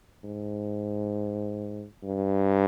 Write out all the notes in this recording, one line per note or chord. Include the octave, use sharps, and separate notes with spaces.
G#2
G2